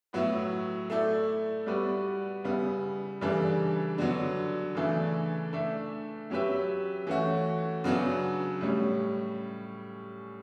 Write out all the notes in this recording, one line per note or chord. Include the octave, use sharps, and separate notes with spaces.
A2 F#3 B3 E4
A3 E4 A4 D5
G3 B3 F#4 B4 D5
C#3 G3 B3 E4
C#3 E3 G3 D4 A4
D3 F#3 B3
C#3 E3 A3 D4 A4
A3 D4 A4 E5
F#3 C#4 G4 B4 E5
E3 A3 C#4 F#4
C#3 F#3 B3 D4
A2 G3 C#4